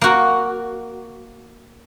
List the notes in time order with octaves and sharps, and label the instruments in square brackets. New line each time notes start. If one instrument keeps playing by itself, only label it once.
[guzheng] A#3 F#4